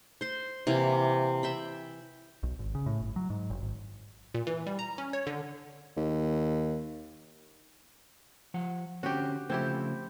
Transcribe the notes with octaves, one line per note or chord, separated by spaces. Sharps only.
C5 C6
C3 E3 A#3
E5 G5 B5
B1
G#1
C#3
A2
G1
F#3
G#2
F#1
G#1
A#2
E3
G3
A#5
C#4
C#5
D3
D#2
F3 F#5
D3 C4 C#4 F#4 G4
C#3 F3 A3 C4 E4 G4